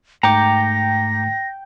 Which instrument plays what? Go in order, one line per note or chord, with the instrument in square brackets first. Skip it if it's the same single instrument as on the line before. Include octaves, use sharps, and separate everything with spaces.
[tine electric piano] G#2 A3 C#7 [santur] G5 [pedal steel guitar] A#5 D6 [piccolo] A#6